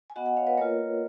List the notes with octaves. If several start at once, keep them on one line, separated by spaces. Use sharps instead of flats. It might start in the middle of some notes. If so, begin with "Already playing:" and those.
G#5
B3 F#4 D#5 F#5
D#5 F#5
C#5 F5
B4 D#5
A#3 F4 A#4 C#5